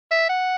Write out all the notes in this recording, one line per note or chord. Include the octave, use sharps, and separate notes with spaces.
E5
F#5